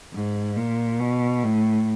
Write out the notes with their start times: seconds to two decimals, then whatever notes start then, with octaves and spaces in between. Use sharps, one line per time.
0.13 G#2
0.57 A#2
1.00 B2
1.43 A2